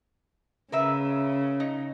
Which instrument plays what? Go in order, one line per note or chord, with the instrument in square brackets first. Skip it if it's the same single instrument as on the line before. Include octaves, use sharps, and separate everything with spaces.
[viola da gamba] C#3 [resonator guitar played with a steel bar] A#4 B4 E5
[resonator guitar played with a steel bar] D#4